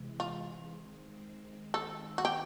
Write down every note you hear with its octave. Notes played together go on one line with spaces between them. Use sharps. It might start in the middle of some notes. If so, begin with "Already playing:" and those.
Already playing: C3 E3 G#3
F4
D#3 G#3 C4
A4
F#4
G4